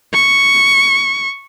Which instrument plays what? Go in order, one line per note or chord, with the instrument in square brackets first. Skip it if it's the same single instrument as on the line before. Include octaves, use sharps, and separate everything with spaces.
[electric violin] C#6